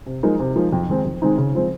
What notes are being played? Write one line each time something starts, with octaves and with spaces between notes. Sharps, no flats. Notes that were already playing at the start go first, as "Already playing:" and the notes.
C3
F3 G#3 D#4 A#4
C3
F3 G#3 D#4 A#4
F2
D#3 G#3 C4 D#4
F2
D#3 G#3 C4 D#4
C#3
F3 G#3 C4